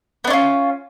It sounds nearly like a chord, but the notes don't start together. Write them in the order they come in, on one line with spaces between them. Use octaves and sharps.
B3 D4 C#4 F4